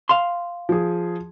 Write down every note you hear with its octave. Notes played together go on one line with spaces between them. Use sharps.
F5 A5 C6
F3 G#4